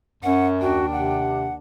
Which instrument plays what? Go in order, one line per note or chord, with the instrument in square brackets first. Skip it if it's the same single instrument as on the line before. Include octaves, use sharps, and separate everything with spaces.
[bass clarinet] F#2 [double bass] C#4 [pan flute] F#5
[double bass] D#2 D4 [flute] F#4 [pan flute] G5
[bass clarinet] C3 [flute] F#5